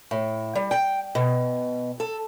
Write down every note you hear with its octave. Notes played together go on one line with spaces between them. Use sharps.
A2
G3
G5
B2
A4